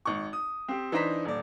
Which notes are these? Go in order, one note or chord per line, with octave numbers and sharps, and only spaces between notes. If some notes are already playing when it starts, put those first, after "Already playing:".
G#1 C#6
D#6
C4 G4
E3 D4 D#4 C5 A#5 B6
D#1 D5